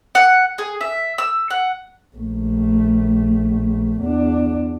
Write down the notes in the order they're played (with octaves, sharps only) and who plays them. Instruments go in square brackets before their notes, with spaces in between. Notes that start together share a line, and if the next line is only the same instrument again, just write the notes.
[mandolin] F#5
G#4
E5
E6
F#5
[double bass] A#1 A3
E2 D4